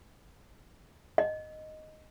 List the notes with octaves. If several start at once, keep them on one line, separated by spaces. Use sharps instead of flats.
D#5